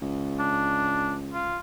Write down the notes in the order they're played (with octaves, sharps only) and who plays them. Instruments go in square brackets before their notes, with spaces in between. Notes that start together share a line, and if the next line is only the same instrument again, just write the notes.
[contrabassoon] C#2
[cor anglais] D4
F4